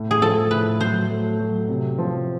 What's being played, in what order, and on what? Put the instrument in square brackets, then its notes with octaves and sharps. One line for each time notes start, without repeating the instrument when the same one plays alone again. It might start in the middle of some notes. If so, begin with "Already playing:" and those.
Already playing: [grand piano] A2
[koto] G#4
[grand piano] F3 [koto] A4
[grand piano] A2 [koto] B4
[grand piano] F#3 [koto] C5
[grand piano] A3
F#3
C3
F3